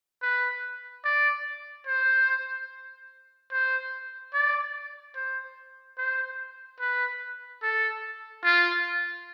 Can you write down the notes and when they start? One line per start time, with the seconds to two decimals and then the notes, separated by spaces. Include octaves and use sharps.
0.22 B4
1.04 D5
1.87 C5
3.52 C5
4.34 D5
5.16 C5
5.98 C5
6.80 B4
7.63 A4
8.44 F4